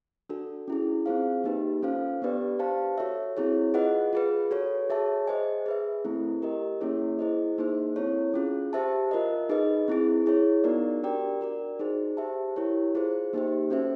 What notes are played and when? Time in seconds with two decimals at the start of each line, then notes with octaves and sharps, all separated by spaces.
0.29 D4 F#4 A4
0.68 C#4 E4 G#4
1.06 C4 F4 G#4 C5 F5
1.44 A#3 D#4 G4 B4
1.82 C#4 F4 A4 C5 F5
2.22 B3 D4 G4 B4 D5
2.59 G4 C5 F5 A5
2.98 F#4 A4 C#5 E5
3.37 C4 E4 G#4 C#5
3.74 F4 G#4 B4 D#5 F#5
4.13 F4 G#4 B4
4.51 F#4 A4 C#5
4.90 G#4 C#5 E5 A5
5.27 G#4 C5 D#5 G#5
5.66 G#4 B4 E5
6.05 A3 C4 E4 A4
6.42 G4 A#4 D#5
6.81 A#3 C#4 E4 G#4 C#5
7.19 E4 G#4 C5 D#5
7.58 A#3 D#4 G#4 C5
7.96 C4 E4 A4 C#5
8.34 C#4 F4 G#4
8.73 G4 C5 E5 A5
9.11 F4 A#4 D#5
9.49 D#4 G#4 B4 D#5
9.88 C4 E4 G#4
10.26 E4 G#4 C#5
10.64 B3 D#4 F#4 A#4 D5
11.03 D4 G4 A#4 D5 G5
11.41 F#4 A#4 D5
11.79 D#4 G#4 C5
12.17 G4 C5 E5 A5
12.56 E4 G4 A#4 C#5
12.95 F4 G#4 C5
13.33 A#3 D#4 G4 C5
13.70 C#4 F#4 A4 C5 E5